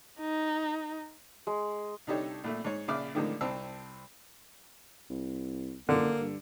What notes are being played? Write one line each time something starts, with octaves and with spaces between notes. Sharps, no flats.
D#4
G#3
C2 D4 D#4 G4 A4 C#5
A#1 A#2 A3
G#2 C#5
A#1 C#3 D5 E5 D6 F6
A2 D3 D#3 F3 G#3 A#3
C2 C4 A5 E6
C2
F#1 D3 A#3
G2